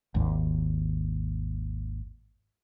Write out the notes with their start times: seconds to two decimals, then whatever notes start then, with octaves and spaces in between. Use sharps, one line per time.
0.15 G#1 D#2